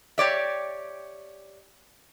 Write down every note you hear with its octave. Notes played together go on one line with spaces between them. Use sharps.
G4 C#5 D5 E5